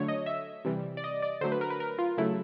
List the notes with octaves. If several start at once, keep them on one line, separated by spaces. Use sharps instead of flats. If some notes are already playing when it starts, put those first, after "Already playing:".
Already playing: D3 F#3 A3 C#5
D#5
E5
C3 E3 G3
D5
D#5
D5
D3 F#3 A3 C5
B4
A#4
B4
A#4
F4
C#3 F#3 A3 E4